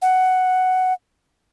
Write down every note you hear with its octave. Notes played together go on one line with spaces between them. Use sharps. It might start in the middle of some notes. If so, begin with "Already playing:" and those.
F#5